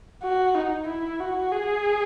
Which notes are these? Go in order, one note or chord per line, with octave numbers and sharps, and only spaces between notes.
F#4
D#4
E4
F#4
G#4